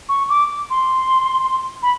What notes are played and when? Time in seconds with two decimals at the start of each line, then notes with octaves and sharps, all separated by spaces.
0.09 C#6
0.29 D6
0.70 C6
1.83 B5